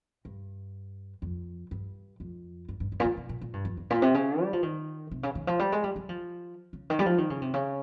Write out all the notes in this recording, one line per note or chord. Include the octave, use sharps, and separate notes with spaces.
G2
F2
G2
F2
G2
G2
G2
A#2
G#2
C3
A#2
A#2
G2
F2
G2
A#2
C3
C#3
G3
F3
D#3
C3
C#3
D#3
F3
G3
G#3
G3
G3
F3
C#3
D#3
G3
F3
D#3
C#3
C3
C#3